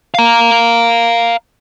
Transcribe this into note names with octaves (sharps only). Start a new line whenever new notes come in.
F5 A#5